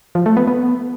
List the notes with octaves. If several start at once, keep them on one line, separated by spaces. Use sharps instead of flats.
F3
A3
B3
B3